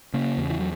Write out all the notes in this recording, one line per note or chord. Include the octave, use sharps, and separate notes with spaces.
C#3 A#3
E2
E3
F#3